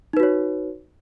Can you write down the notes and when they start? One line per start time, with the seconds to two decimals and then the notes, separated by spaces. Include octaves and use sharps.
0.13 D#4
0.17 B4
0.20 F#4
0.23 C#5